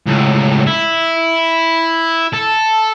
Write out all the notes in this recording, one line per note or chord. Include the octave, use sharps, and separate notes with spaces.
C#2 A2
E4
A4